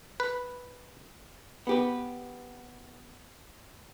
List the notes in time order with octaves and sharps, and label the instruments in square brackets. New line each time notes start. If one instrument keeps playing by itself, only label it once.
[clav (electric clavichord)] B4
[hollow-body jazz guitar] B3 G4 B4